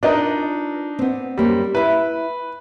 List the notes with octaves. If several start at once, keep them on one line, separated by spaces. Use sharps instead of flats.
D4 D#4 F4 A#4 B4 A#5
B3 C4
F#2 G3 A#3 C5
E4 B4 E5